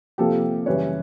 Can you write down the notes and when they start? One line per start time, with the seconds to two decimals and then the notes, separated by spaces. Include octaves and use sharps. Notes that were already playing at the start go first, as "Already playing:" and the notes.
0.18 C3 F3 A#3 G4 A4
0.66 F#2 C#3 E3 G3 B4 C#5